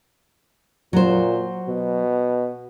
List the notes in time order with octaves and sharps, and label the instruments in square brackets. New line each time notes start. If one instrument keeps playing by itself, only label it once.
[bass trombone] A#2 [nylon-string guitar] F#3 C5
[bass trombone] B2